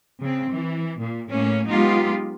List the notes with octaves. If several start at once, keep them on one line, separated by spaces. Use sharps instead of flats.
C#3 C4
E3
A#2
A2 A#3 C#4
F#3 G#3 B3 D#4 F4 G4